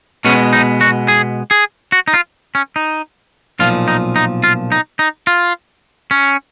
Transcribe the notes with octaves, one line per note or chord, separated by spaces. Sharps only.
B2 G#3 B3 C#4
D#4
F#4
G#4
G#4
F#4
D#4
F4
C#4
D#4
B1 A#2 F3 F4
D#4
D#4
F4
D#4
D#4
F4
C#4